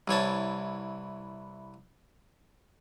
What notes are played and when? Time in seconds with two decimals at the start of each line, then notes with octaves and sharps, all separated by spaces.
0.08 C2 E3 C#5 A5